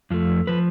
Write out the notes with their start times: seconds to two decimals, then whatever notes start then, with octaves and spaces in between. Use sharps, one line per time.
0.11 F2 F3 A3
0.47 F3 B4